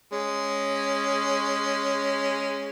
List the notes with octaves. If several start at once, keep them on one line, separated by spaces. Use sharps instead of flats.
G#3 C#4